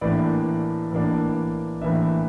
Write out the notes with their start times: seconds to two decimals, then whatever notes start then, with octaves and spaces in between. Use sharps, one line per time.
0.01 A2 E3 A#3 D4 D5
0.91 A2 E3 A#3 D4
1.81 A2 E3 A#3 D4 E5